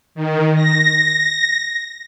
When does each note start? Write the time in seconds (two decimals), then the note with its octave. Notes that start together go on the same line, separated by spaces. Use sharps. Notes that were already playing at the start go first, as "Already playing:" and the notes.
0.15 D#3
0.55 A#6